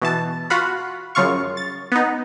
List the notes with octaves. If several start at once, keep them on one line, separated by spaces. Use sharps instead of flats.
B2 E3 A5
F4 F#4 F5 F#5 B5
F#2 C#3 F4 F5 C#6
A6
B3 D#4